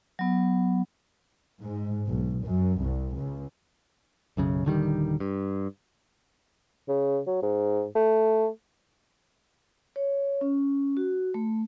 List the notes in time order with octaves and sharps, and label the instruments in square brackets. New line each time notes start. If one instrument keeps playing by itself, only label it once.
[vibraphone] F#3 B3
[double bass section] G#2
B1
F#2
C2
C#2
[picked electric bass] B1 F#2 C#3
D#1 D3 D#3 G3
G2
[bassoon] C#3
F#3
G#2
A3
[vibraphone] C#5
C#4
F#4
A3